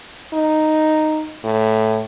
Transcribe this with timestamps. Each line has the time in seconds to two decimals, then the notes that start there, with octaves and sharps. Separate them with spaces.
0.33 D#4
1.44 A2